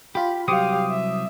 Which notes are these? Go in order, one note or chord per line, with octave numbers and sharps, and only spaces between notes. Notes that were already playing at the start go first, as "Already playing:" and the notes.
F4 G4 B5
C2 F#3 G4 C5 F5 D6 D#6
E5